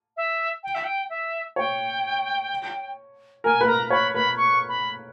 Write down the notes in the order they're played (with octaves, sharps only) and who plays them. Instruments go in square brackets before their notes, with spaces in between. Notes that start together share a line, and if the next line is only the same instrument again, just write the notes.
[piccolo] E5
G5
E5
G5
E5
[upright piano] C#5 [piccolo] G5
[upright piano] A#4 [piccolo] G#5
[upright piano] B4
[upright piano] A#4 [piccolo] A#5
[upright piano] C#5 [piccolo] B5
[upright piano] B4 [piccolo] B5
[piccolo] C#6
B5